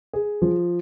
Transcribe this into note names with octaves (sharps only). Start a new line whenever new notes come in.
G#4
F3